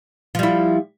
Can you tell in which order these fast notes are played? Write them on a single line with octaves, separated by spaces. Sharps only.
F3 G3 E4